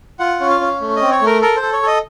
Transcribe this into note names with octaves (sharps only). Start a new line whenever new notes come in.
F4 F#5
C#4
F5
C#4
A3
C4 D#5
C#5
A3 A#4
A4 A#4
C5
A4
C#5
A4 D#5